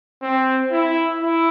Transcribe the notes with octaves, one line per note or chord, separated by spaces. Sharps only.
C4
E4
E4